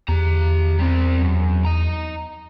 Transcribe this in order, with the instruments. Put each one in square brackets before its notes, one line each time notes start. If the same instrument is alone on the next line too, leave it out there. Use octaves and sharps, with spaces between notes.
[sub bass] E2 [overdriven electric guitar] G4 A#5
[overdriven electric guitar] G3 C4
F#2
D#5 A#5